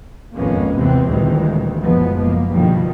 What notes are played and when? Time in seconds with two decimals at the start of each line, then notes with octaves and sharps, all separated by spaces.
0.36 G#1 F2 G#3 A#3 B3 C#4
0.78 D#2 C3 E3 B3 C4
1.06 D2 A#2 D#3 E3 G3 G#3
1.82 F#1 B2 F3 G#3 B3
2.21 A#3
2.53 G2 B2 D3 D#3 F3 G3